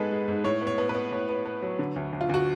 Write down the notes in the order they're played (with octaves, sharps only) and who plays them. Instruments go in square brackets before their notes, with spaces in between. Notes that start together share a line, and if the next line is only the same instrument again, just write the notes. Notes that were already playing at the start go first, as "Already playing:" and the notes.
Already playing: [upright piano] G#2 G#3 B3 A4 B4
G#3
G#2
A2 C#5
B3
C#5
B3
B4
B3
A2
B3
B3
F#3
D3
D2
D2
F4
D2 F#4